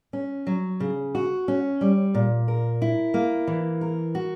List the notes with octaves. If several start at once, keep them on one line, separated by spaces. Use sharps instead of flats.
C#4
F#3
C#3
F#4
C#4
G3
A#2
A#4
E4
A#3
E3
A#4
F#4